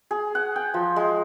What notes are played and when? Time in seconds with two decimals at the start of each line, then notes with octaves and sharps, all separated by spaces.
0.11 G#4
0.35 F#5
0.56 G5
0.74 F3
0.96 G#3